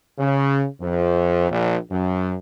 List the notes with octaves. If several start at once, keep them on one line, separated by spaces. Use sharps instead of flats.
C#3
F2
A#1
F#2